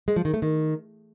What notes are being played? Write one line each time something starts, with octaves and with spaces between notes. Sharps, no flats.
G#3
F3
D#3
A3
D#3